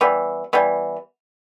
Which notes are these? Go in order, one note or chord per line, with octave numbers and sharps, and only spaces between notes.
E3 G3 B3
E3 G3 B3